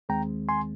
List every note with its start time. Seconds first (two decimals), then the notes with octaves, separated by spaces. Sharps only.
0.09 D#2 D#3 G#3 C4 G5 A#5
0.49 G#5 C6